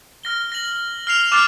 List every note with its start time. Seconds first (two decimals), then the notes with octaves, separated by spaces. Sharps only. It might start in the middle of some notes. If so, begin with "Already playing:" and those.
0.23 F6 A#6 G7
0.52 A#6 F#7
1.07 F6 C7 F7 G7
1.32 D6 F6 F#6 A6 C7 F7